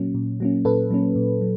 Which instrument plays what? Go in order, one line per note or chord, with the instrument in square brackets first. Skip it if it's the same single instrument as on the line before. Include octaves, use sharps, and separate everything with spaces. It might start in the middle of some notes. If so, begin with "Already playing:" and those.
Already playing: [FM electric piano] A#2 F#3 A#3 C#4
A#2
F#3 A#3 C#4
A#2 A4 B4
F#3 A#3 C#4
A#2
F#3